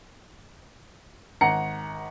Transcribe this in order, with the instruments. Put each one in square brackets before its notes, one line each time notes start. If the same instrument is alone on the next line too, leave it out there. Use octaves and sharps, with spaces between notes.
[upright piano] G#1 F#5 A#5 C#7